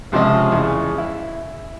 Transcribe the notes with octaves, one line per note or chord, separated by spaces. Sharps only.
C#2 C3 F3 C4 C#4 D#5
E2 C#3
E4